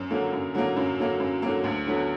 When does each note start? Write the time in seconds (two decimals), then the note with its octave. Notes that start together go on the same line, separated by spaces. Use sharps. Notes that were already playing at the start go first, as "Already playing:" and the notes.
Already playing: F#2
0.10 D3 F#3 A#3
0.33 F#2
0.54 D3 F#3 A#3
0.76 F#2
0.99 D3 F#3 A#3
1.20 F#2
1.42 D3 F#3 A#3
1.64 D2
1.87 D3 F#3 B3